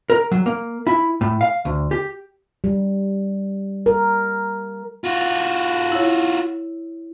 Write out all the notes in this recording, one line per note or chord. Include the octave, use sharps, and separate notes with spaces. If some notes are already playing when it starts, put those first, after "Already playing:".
A#4
F#3
A#3
E4
A2
F5
D2
G4
G3
A#4
F4 F#4
E4 C#5